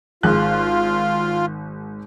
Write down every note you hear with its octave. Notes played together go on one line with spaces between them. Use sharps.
G#1 F4 G#4 F#6